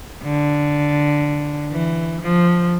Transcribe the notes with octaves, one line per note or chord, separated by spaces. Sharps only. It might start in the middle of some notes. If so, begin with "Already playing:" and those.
D3
E3
F3